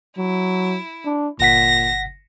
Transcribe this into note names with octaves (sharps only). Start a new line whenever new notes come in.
F#3 E4
D4
G1 A#2 F#5 A#6 B6